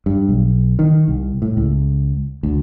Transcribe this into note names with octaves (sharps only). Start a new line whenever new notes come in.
G2
B1
D#3
C2
A2
C#2
D2